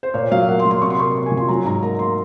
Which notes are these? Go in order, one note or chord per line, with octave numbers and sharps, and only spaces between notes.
C5
A#2 C#5
F#3 F5
A#3 F#5
C6
F#3
C6
C3 C#6
C6
A#3 C#6
C3
G#5
F3
C6
F#3 A#5
G#2 A#5
A#3 A#5
A#5
A#3 C6